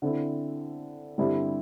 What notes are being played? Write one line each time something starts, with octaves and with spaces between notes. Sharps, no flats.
D3 C4 E4
G2 D3 G3 C4 E4